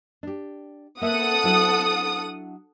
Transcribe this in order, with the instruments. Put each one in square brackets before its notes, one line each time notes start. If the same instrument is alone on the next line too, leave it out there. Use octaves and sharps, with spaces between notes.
[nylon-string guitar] D4 G4
[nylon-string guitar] A#3 E5 [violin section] A4 F#5 [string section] D#6
[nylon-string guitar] F#3 D4 E4